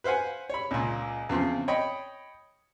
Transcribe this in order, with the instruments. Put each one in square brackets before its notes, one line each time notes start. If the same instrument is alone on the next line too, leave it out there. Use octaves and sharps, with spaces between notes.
[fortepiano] B4 C5 F5 F#5 G#5
C#5 B5
C#2 A#2
E2 C#3 F3 C4
C#5 D#5 G5 B5